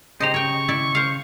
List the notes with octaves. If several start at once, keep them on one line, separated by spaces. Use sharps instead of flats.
C#3 D#4 G4 C5 D#5 A#5
C#5 G5 C#6
E4 D5
C5 F5